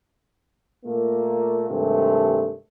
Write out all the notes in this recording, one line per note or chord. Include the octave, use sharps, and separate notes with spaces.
A#2 A3 A#3
G2 C3 D#3 G#3 A3